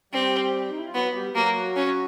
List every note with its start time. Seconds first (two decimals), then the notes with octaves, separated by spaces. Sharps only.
0.13 G3 C4 G4
0.70 D#4
0.77 E4
0.86 F4
0.94 F#3 B3 F#4
1.15 G3 G4
1.35 F#3 A#3 F#4
1.76 C#4